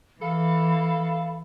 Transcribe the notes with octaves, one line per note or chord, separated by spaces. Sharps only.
E3 A4 F5 B5